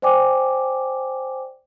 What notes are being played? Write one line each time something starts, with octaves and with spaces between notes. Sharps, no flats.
C5 D5 G5 G#5 D6